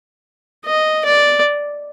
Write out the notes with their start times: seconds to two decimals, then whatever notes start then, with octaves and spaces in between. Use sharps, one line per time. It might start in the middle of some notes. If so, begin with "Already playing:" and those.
0.65 D#5
1.05 D5